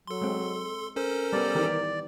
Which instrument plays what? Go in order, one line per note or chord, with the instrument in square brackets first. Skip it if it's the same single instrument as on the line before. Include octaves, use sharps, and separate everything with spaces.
[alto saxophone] F#3 [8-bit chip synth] A4 C6
[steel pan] G#3 C4
[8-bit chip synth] C#4 A4 C5 [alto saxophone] A#4
[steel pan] G3 B3 [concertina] D5
[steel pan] D#3 E3 G4